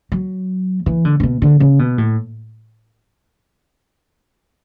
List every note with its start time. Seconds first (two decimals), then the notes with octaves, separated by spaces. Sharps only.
0.12 F#3
0.86 E3
1.05 D3
1.20 C#3
1.23 B2
1.42 D3
1.60 C#3
1.79 B2
1.98 A2